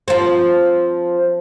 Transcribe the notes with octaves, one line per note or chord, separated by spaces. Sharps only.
F3 C4